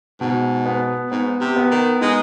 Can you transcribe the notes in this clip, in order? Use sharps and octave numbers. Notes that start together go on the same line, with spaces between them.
G#2 B2
B3
G#2 B3
C3
B3
D#3
G#3 D#4